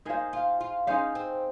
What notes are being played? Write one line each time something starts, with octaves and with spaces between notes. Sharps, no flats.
A#3 D#4 G#4 C5 F5
F4
F4
C#4 D#4 G#4 C5 F5
C4